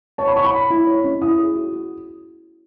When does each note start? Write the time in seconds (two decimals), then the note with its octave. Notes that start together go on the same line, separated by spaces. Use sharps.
0.18 C#5 A5
0.28 B5
0.36 C#5 C#6
0.45 B5
0.53 C#5
0.70 E4
0.87 C#5
1.04 C#4
1.22 E4 D#6
1.38 G#4
1.56 F#4
1.73 F#4